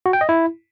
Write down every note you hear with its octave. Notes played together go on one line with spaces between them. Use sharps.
F#4
G5
D#5
E4